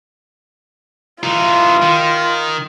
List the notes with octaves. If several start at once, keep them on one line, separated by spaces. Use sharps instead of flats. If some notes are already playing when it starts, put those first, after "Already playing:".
E3 D#4 F4
D#3